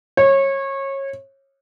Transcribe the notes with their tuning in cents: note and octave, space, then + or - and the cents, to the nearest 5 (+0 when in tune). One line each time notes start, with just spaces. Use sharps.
C#5 -25